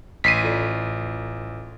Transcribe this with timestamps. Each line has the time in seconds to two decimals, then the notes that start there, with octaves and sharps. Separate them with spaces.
0.24 A1 B6 C7 D#7
0.43 F4 A4 D5